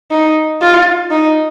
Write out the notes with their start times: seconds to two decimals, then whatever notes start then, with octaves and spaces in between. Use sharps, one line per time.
0.11 D#4
0.61 F4
1.11 D#4